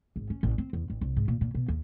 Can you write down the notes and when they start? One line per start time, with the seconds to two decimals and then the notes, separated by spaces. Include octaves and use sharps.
0.16 G#1
0.30 C#4
0.43 A1
0.58 C4
0.73 E2
0.90 A1
1.01 C2
1.16 G#2
1.28 A#2
1.41 A#2
1.55 B2
1.68 D#2